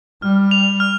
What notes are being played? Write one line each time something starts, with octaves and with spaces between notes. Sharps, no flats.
G3 F6
F7
F6